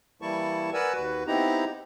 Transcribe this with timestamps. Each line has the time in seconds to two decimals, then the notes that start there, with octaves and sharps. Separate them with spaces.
0.22 E3 G3 A#3 E4 A5 C#6
0.73 A#4 B4 D5 F#5 G#5 E6
0.95 D#2 F#4 B4
1.27 B3 C4 D#4 E4 G4 A#5